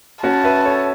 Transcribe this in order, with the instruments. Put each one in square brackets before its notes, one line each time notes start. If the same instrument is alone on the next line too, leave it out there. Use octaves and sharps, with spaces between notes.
[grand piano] C#4 F#4 [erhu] A5
[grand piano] B4 E5
A4 C#5